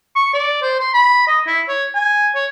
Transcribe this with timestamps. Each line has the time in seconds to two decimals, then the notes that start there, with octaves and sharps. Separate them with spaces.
0.16 C#6
0.34 D5
0.62 C5
0.80 C6
0.94 B5
1.28 D#5
1.47 E4
1.69 C#5
1.95 G#5
2.35 C#5